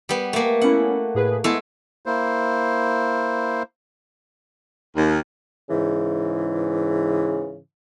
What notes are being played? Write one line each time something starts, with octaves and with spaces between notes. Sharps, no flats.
G3 B3
A3 A#3
B3 C#4 E4 F#5
A2 G#4 B4
G#3 A3 B3 E4 A4
A#3 E4 C5
D#2
G#2 C#3 E3